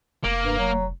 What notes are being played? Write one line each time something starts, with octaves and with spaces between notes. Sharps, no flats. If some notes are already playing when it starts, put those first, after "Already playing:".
F1 A#3
G2
F#3